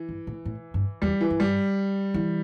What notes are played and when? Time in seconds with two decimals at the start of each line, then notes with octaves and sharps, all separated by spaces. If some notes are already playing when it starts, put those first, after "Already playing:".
Already playing: E3
0.09 G2
0.27 A2
0.45 A2
0.74 G2
1.02 E2 G3
1.21 E3
1.30 G2
1.40 G3
2.14 E3